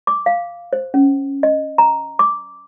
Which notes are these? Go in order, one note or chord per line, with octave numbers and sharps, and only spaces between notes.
D6
F5
C5
C#4
D#5
A#5
D6